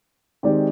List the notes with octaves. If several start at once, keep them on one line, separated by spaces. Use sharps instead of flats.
D#3 G#3 C4 G4 D5